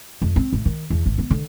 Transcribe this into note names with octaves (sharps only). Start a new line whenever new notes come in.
F2
C4
A1
D#3
E2
G#1
B3
D3